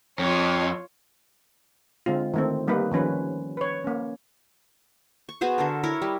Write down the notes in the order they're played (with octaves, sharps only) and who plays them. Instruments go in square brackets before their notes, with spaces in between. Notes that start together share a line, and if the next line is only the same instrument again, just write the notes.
[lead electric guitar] F2 [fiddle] F4 C#5
[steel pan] D3 G#3 C4 F4
D#3 A3 C4
G3 A#3 D#4 G4 B4
D#3 F3 C#4 B4
B4 C#5
A#3 C#4
[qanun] C#6
B3 F#4 G#4 C5
D3 A4 A#4
E4 A#4 C#5
G3